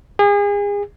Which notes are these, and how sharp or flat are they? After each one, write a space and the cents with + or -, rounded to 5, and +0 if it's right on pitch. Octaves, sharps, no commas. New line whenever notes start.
G#4 -35